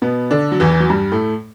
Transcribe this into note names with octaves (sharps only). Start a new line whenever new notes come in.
B2 B3
D3 D4
F#3
E2 E3
E3
F#3
G2 G3
A2 A3